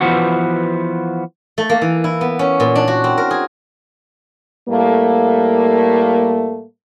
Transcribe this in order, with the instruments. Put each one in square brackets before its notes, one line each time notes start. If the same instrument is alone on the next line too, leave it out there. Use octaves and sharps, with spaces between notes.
[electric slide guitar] E3 F3 B3 F#4
[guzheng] A3
A#3
E3
E4
B3
C#4
A#2
D4
F#4
C4
A#4
G#4
[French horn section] A2 G3 A3 A#3